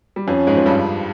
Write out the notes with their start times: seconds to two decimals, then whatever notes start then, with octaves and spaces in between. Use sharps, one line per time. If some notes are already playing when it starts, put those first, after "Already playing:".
0.16 G3
0.28 F2 F3 C#4
0.47 G#2 G#3
0.57 F3
0.66 G2 G3